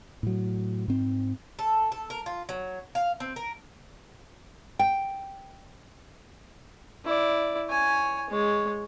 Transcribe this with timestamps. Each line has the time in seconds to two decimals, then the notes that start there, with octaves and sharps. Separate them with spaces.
0.23 A2 F#3
0.88 G#2 C4
1.59 A4
1.92 A4
2.10 A#4
2.26 F4
2.49 F#3
2.95 F5
3.20 C4
3.36 A#4
4.79 G5
7.05 E4 D5
7.70 C#5 G#5
8.30 G#3 C#5